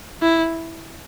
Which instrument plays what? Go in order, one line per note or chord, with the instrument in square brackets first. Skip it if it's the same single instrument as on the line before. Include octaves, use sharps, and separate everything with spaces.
[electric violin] E4